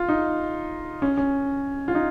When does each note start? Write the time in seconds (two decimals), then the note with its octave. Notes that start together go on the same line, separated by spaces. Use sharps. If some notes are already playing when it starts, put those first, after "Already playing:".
Already playing: F4
0.09 D#4
1.02 C#4
1.17 C#4
1.88 F4
1.95 D#4